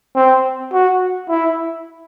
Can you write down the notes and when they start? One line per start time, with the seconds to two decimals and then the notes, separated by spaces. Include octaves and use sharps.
0.16 C4
0.73 F#4
1.29 E4